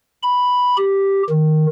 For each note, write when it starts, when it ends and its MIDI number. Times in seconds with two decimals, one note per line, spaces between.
0.23 0.76 83
0.78 1.23 67
1.30 1.66 51